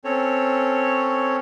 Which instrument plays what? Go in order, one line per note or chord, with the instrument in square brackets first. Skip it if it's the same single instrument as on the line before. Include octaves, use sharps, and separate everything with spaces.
[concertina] C4 C#4 A4 C#5